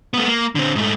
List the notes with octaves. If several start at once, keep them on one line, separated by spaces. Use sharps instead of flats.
A3 B3
A#3
D3 C4
G#2 A3